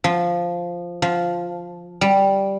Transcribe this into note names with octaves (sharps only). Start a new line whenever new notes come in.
F3
F3
G3